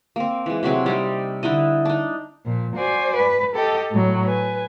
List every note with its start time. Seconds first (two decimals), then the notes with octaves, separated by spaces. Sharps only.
0.16 A#3 C4
0.46 E3 G#3
0.63 C3 F#3 C4 G#4
0.86 G3 C4 D#4
1.43 D3 D#4 E4 D#5
1.85 D4 D#4
2.46 A#2 F3
2.77 F#4 C5 D5 G#5
3.17 B4
3.55 G4 A4 D#5
3.91 A2 F#3
4.26 B4 G#5